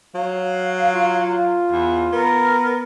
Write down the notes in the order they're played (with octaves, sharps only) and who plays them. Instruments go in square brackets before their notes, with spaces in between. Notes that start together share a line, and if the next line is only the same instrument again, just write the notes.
[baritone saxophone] F#3 [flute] F5
[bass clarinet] F4
[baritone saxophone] E2
[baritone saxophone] B3 [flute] A#4